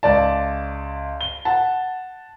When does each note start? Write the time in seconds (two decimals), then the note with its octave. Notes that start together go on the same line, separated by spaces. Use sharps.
0.03 C#2 D5 A5
1.21 G7
1.45 F#5 A5